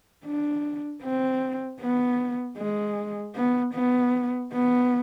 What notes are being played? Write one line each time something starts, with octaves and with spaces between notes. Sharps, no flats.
D4
C4
B3
G#3
B3
B3
B3